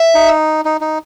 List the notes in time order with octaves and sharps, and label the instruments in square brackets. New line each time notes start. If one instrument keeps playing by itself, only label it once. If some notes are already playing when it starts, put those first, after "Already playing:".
Already playing: [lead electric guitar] E5
[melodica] D#4
D#4
D#4